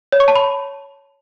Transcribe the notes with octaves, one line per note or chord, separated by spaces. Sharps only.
C#5
C#6
A5
B5